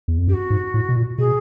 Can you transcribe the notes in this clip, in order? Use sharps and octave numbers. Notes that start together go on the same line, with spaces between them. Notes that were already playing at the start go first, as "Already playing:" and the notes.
E2
F2
F#2 G4
F#4
G#2
A2
B2
A#2
B2 G#4